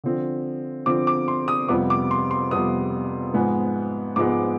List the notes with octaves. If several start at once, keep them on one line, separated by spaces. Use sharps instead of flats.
D3 F3 C4
D3 F3 C4 D6
D6
C6
D#6
F2 C3 G3 B3 D6
D6
C6
C6
F2 C3 G3 B3 D#6
G#2 F3 G#3 B3
G#2 F3 G#3 B3 D6